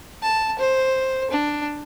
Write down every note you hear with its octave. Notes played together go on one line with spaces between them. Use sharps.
A5
C5
D4